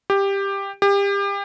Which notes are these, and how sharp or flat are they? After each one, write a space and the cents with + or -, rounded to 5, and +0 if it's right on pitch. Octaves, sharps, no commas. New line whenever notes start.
G4 +10
G4 +30